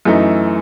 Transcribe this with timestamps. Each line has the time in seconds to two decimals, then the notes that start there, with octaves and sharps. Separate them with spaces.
0.05 F#2 E3 A3 D#4